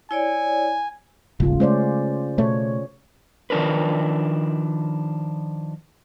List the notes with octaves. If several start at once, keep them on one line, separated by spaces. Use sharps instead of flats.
E4 C#5 D5 G#5
D#1 G#1 C#3 F4
G#3 A3 C#4 C5 D5
B2 A3 C#5
D#3 F3 D4 A#4 B4